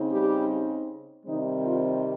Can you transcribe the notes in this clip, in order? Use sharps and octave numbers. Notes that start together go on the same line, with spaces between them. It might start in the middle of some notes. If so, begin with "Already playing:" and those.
Already playing: C#3 C4 D#4
G3 G4
C3 D#3 G3 C4 D#4
F4